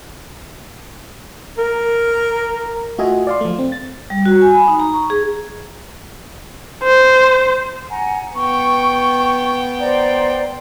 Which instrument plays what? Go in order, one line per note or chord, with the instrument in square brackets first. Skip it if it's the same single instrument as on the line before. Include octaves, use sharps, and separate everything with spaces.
[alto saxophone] A#4
[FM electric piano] A3 F4 F#4 D#5 E5 G#5
D5 F5 C6
F3 A3
C4
A6
[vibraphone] G3
F#4
G#5
B5
D#4
A#5
C#6
G#4
[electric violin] C5
[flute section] F#5 G#5 A#5
[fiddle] B3 G5 [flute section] C#6
[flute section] C5 D5 A#5